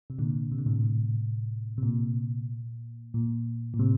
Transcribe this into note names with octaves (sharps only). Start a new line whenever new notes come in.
C3
A#2 D3
C3
D3
A2 C3
C3
A#2
A#2
A#2
A2 C3